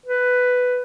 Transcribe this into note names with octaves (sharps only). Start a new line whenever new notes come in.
B4